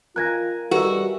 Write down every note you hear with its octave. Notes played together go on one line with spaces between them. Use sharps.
F4 A#4 G#5 A#5 F#6 G#6 A#6
G3 F#4 G4 A4 B4 E5 A#5